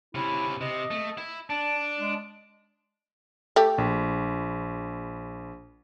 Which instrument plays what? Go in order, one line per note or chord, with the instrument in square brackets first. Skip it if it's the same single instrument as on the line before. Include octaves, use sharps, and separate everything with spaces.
[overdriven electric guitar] C3 C#4 [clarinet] E4
[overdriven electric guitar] C3 [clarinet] D#5
[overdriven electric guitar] A3
E4
[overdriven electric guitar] D4 [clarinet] A5
[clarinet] G#3
[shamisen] A3 G4
[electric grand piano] A#1